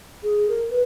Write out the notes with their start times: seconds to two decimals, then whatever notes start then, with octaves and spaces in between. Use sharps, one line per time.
0.23 G#4
0.49 A#4
0.71 B4